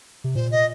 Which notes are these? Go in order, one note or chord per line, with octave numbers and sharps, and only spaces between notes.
C3
A#2 C5
D#5